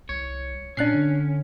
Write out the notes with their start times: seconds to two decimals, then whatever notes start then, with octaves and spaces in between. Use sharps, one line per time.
0.09 C2 C#5
0.77 A#2 C#4 D4 F#6 C7
0.94 D3